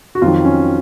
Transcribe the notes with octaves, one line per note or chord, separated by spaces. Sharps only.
F#4
F2 D#3 F#3 F4
C#4